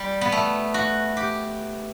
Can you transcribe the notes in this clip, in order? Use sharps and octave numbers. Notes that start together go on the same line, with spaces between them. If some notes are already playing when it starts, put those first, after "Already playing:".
Already playing: G3
B3
A3
F#4
G4